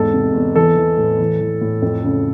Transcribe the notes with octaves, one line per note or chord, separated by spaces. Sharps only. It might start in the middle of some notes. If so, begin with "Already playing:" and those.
Already playing: E2 G#2 A4
C3
E2
E3 A4
E3
A2
E3
E3
A2
F2
C#3